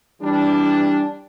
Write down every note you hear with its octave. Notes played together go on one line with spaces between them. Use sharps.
E3 G3 D4